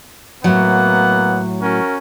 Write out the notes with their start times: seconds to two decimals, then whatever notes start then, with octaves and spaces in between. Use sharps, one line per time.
0.44 A2 F#3 A#3 B3 F#5
1.61 C#4 F#4 A#4